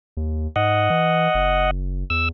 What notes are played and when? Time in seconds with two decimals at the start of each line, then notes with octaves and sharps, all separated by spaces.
0.17 D#2
0.56 G#2 D#5 F#5
0.90 E3
1.34 F#1
2.10 E2 E6